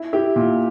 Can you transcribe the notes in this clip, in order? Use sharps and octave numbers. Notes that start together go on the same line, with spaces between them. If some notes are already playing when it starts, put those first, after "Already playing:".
Already playing: E4
E4 G4
A#2